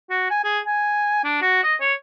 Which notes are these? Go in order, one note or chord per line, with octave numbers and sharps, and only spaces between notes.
F#4
G#5
G#4
G#5
D4
F#4
D#5
C#5